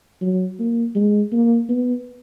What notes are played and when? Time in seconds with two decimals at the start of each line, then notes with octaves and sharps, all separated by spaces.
0.22 F#3
0.59 A#3
0.95 G#3
1.32 A#3
1.69 B3